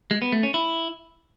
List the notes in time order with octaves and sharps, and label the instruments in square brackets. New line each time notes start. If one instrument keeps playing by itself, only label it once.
[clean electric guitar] G#3
B3
A3
C#4
E4